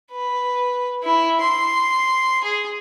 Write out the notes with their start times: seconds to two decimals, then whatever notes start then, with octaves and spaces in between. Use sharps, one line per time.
0.12 B4
1.03 E4
1.41 C6
2.44 G#4